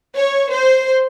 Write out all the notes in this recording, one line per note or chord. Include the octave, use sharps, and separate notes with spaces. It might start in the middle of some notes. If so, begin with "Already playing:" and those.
C#5
C5